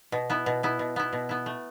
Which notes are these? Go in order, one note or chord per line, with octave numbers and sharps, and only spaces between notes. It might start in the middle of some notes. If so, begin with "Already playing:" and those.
B2
B3 E4
B2
B3 E4
B2
B3 E4
B2
B3 E4
A3